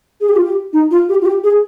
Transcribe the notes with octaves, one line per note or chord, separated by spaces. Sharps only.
G#4
G4
F4
G4
D#4
F4
G4
F4
G4
G#4